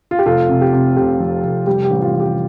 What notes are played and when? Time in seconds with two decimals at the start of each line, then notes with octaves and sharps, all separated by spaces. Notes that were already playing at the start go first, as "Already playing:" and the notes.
0.11 F4
0.19 G4
0.26 F1 F4 A4
0.49 C3
0.61 G4
0.73 C3
0.96 F1 G4
1.20 F2
1.44 F1
1.67 G3 G4
1.85 G4
1.91 A1
2.01 F4
2.14 A1
2.20 G4